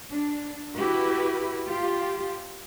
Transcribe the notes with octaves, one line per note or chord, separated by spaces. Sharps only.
D4
E4 F#4 G4 B4
F4 G4